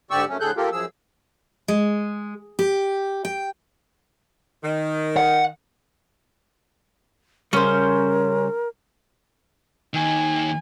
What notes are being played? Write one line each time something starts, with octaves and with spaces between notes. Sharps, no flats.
G#2 D3 G4 D5 C#6 E6
F#2 C#3 F#3 A3 C#4
A2 D3 G#4 A4 F#6 G6
A#3 F4 G4 A4 A#4
F#2 F3 G#4 E6
G#3
G4
G5
D#3
F#5
C#3 G3 C#4 A#4 C5
D#2 D#3 G#5